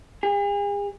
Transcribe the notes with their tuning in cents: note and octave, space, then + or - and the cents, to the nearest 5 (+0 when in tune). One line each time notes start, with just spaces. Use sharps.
G#4 -45